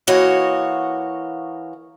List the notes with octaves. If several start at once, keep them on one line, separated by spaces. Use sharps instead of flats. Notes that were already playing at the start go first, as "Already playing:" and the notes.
E3 A#3 F#4 C#5 D#5